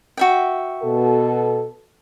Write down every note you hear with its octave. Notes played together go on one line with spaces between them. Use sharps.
F#4 E5 G5
B2 A4